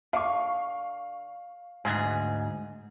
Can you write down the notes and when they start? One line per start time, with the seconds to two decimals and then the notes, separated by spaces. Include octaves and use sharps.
0.13 D3 F5 C#6
1.85 D2 G#2 G#3 G#4